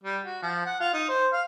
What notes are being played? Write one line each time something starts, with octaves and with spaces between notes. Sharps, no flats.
G3
F#4
F3
F#5
F4
D#4
C5
F5